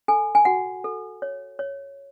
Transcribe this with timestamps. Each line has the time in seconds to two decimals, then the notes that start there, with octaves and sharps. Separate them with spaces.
0.08 A4 G#5
0.35 G#5
0.45 F#4 F#5
0.84 A4
1.22 C#5
1.59 C#5